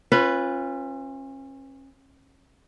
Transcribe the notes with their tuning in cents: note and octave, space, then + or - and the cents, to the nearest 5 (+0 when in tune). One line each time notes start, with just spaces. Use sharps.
C#4 -35 F4 +0 B4 +0